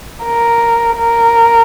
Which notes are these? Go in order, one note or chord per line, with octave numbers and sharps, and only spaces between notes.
A#4
A#4